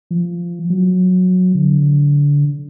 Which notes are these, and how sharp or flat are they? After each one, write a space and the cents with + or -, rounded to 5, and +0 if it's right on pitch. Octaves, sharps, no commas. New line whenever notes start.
F3 -15
F#3 -15
D3 -25